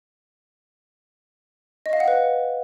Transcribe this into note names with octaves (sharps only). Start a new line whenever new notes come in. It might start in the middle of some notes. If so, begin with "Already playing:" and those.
D#5
F5
F#5
B4